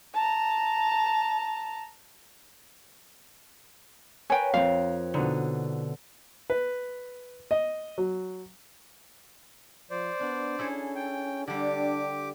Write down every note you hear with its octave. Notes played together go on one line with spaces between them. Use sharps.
A5 A#5
A#4 B4 C#5 G5 G#5
F2 C4 F5
B2 D3 D#4
B4
D#5
F#3
F3 C5 D5
B3 D4
C#4 E4 G#4 A4
G5
D3 G3 D4 G4 D6